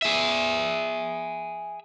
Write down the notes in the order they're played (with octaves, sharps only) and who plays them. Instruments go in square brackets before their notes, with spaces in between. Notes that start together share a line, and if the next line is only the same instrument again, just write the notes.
[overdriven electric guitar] G#4 E5